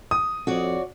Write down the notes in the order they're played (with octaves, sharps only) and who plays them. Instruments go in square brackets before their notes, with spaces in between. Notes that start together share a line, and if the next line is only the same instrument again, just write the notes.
[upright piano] D#6
[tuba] F2 [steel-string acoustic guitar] F#4 C#5 D5